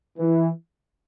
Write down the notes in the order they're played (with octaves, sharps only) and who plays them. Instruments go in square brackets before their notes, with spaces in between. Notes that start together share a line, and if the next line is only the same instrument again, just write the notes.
[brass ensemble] E3